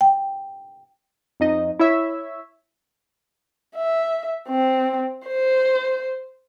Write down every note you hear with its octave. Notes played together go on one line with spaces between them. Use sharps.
G5
F2 D#4 D#5
E4 C#5 E5
E5
C4
C5